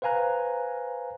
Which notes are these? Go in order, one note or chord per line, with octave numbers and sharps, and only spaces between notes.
B4 C5 F5 G#5 A#5 F#6